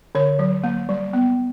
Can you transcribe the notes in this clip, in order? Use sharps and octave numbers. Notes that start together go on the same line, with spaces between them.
D3 C#5
F#3
A#3
G3
B3